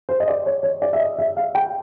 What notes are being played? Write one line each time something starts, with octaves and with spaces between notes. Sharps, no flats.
C5
D#5
D5
C#5
C#5
D5
E5
D#5
E5
F5
G5